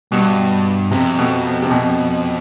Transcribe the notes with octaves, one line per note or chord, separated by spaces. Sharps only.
G2 B2
F2 C3
B2
C3
B2